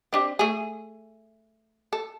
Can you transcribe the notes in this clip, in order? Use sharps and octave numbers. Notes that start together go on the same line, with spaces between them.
C4 D4 G4
A3 G#4
A4